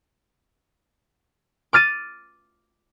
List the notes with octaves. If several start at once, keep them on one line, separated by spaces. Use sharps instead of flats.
D6 F6 A6 D#7